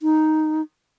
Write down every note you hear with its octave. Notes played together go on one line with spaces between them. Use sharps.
D#4